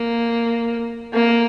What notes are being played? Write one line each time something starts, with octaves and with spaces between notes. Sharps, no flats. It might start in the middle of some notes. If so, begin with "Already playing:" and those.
Already playing: A#3
A#3